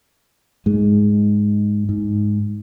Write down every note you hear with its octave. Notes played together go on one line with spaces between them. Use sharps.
G#2 G#3
G#2